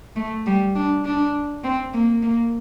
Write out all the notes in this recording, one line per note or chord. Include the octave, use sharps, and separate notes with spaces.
A3
G3
D4
D4
C4
A#3
A#3